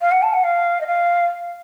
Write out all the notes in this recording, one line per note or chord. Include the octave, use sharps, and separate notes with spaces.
F5
F#5
A5
F#5
F5
D#5
F5